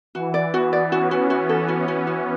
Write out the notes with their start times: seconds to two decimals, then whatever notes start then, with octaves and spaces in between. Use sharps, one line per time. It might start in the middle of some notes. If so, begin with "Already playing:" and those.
0.15 E3 F#4
0.34 D5
0.54 B3 F#4
0.73 D5
0.92 C#4 F#4
1.11 F#4
1.30 F#4
1.49 A4
1.68 F#4
1.88 F#4
2.07 F#4